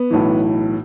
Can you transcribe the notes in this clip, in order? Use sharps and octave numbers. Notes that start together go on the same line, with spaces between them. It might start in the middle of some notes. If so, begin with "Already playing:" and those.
Already playing: B3
B1 A2 E3